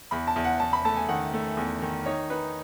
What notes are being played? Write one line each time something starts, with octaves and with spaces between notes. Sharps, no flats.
E2 B5
A5
E2
F#5
E2 A5
B5
A3 A5
G#5
D#3 F#5
A3
E2
D#3
D#4 C#5
D#4 B4